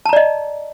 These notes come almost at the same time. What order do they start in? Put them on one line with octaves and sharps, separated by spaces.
A5 A#5 D5 D#5